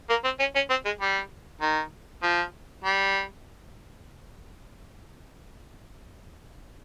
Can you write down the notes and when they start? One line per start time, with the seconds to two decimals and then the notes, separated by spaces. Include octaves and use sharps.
0.10 A#3
0.24 C4
0.40 C#4
0.56 C#4
0.70 C4
0.85 G#3
1.01 G3
1.61 D#3
2.23 F3
2.84 G3